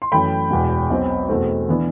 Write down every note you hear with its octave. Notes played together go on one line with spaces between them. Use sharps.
C6
F#2 E3 A3 G5 B5
E1 E2 B2
B1 B2 F#3 C4
E2 B2 A3 C4
E3 B3 D4